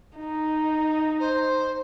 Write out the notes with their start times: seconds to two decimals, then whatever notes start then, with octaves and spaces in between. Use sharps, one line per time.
0.17 D#4
1.19 C5